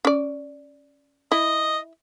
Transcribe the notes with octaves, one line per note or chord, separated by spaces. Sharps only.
C#4 D5
E4 D#5